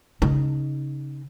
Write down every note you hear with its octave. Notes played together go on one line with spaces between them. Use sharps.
C#3 D#4